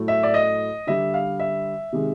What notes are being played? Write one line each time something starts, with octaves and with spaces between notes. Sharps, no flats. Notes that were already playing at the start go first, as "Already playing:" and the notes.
Already playing: A2 F#3 A3
E5
D5
D#5
D3 G3 E5
F5
E5
C3 D#3 G#3